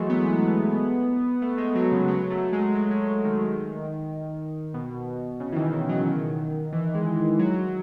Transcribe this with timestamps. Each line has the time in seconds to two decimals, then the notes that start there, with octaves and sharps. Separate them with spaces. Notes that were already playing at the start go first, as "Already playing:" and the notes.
Already playing: E3 F#3 G#3 A3
0.10 B3
1.42 A3
1.58 G#3
1.75 F#3
1.92 C#3
2.08 F#3
2.30 A3
2.53 G#3
2.75 F#3
2.91 G#3
3.08 F#3
3.25 D#3
3.41 D#3
4.74 B2
5.40 C#3
5.52 E3
5.56 D#3
5.73 E3
5.89 F#3
6.06 D#3
6.73 E3
6.95 G#3
7.39 F#3